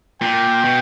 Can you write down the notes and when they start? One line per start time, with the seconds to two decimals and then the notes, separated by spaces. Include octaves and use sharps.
0.21 A#2 G5
0.65 B2